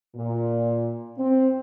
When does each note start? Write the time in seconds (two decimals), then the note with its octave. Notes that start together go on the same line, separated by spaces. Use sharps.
0.15 A#2
1.18 C4